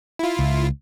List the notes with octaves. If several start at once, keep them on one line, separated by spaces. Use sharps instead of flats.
E4 F4
C#2